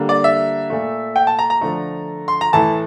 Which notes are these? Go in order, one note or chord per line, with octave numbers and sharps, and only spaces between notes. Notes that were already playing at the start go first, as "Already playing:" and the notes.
Already playing: D3 G3 A#3
D5
E5
A#2 A3
G5
A5
A#5
A#5
D3 F3 A3
C6
A#5
A2 E3 A3 A5